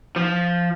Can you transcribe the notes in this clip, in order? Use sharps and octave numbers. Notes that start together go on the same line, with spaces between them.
F3